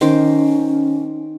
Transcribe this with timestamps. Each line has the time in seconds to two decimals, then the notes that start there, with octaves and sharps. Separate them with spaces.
0.01 D#3 C#4 C5 D6